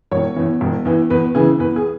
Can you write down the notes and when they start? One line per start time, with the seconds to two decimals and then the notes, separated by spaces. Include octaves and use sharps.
0.11 E1 C#5
0.36 E2 E3
0.61 E1
0.85 E2 E3
1.10 E2 B4
1.35 C#3 E3 G#4
1.59 E2 B4
1.76 G#4